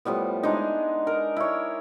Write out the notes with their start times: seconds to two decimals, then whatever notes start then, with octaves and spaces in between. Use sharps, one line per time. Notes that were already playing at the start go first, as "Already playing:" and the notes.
0.05 A2 F3 G3 B3
0.43 G#3 D4 D#4
1.07 A#4
1.37 E4 C#5